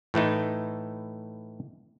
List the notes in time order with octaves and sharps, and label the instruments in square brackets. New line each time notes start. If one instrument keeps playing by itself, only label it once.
[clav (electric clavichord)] A2 E3 A3 D#4